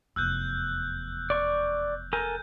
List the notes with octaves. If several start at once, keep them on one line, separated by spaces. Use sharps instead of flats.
F1 E2 E6 F#6 G6
D5 C#6
A4 A#4 G#5 G6